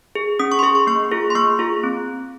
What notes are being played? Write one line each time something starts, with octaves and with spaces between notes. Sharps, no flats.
G#4
C#4 D#6
C#6
C6
G#4 C#6
C#6
A#3 C#6
F4 G#4
C6
A#3 C#6
F4 G#4
C4